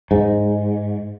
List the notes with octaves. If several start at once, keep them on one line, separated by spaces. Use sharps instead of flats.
G#2